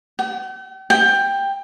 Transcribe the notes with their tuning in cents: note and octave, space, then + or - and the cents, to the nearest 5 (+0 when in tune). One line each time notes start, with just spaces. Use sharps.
G5 -40
G5 +15